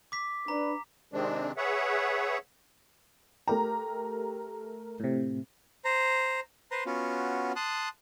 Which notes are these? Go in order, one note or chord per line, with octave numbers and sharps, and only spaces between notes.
D6 B6
D4 B4 A#5
C3 D#3 G#3 C4 D4
G#4 B4 C#5 E5 F#5
A3 G4 A#4 A#5
A2 C3
C5 A#5
B4 C5 A#5 C6
B3 C#4 F4 F#4
A5 C6 D#6 F#6